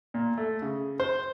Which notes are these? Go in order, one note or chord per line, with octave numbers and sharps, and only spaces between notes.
A#2
A3
C#3
C5